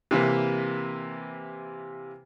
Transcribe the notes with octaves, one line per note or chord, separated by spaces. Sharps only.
C3 E3 A#3 B4